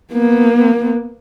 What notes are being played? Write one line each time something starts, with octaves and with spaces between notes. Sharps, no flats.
A#3 B3